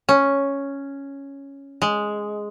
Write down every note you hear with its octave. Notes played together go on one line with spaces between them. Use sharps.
C#4
G#3